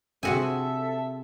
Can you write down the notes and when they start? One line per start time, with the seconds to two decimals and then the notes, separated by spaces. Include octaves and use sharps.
0.23 C3 C4 F#4 G#4 A4 E5 G#5